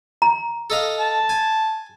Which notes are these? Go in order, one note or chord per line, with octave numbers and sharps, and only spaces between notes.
A#5
A4 D#5 F5
A5
G#5